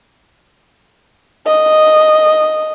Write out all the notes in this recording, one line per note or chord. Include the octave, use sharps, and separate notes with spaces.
D#5